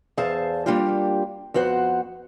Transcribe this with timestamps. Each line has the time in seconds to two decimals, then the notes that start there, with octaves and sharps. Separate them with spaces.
0.17 E2 G#4 C5 E5 F5 A5
0.66 G3 A#3 D4 F4 G4
1.54 F2 B3 F#4 C5 F#5